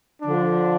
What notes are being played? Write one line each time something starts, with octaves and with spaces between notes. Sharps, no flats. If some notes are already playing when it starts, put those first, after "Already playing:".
D3 F3 D4